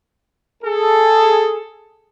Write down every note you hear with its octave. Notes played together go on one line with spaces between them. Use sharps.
G#4 A4